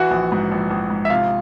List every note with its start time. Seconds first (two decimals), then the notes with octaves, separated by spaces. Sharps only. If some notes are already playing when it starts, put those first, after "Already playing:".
Already playing: E3 F#4 F#5
0.11 A#1
0.32 G#2
0.52 A#1
0.70 A#1
0.90 G#2
1.05 E5
1.10 C3 F4 F5